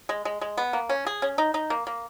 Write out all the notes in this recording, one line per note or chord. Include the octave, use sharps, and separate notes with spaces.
G#3
G#3
G#3
B3
A#3
C#4
G#4
C#4
D#4
D#4
A#3
A#3